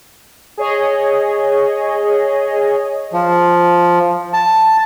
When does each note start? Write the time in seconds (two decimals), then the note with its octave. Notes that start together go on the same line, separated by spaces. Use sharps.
0.57 G#4 C#5 D#5
3.13 F3
4.33 A5